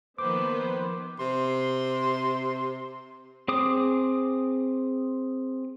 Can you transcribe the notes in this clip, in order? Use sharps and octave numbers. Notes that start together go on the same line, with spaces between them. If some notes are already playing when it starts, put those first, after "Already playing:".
D#3 F3 A#3 B3 B4 C5 D6
C3 C6
C4 G#4 D6 D#6